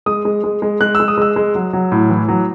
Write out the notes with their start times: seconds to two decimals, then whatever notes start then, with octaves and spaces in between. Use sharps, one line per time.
0.06 G#3 D#6
0.25 G#3
0.44 G#3
0.62 G#3
0.81 G#3 F#6
0.95 E6
1.00 G#3
1.08 D#6
1.18 G#3 E6
1.36 G#3
1.55 F#3
1.73 F#3
1.92 A2
2.10 E3
2.28 F#3